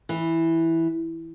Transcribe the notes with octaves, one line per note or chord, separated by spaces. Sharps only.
E3